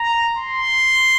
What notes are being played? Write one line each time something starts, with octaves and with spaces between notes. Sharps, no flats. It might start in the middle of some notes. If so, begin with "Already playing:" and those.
Already playing: A#5
C6